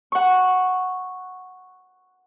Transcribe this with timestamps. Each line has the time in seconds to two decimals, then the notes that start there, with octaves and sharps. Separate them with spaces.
0.12 F#5 C#6